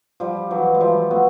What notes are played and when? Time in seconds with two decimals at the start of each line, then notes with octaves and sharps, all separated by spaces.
0.20 F3 G3
0.51 E3 F#3
0.75 G#3
0.81 F3 G3
1.11 A3 B3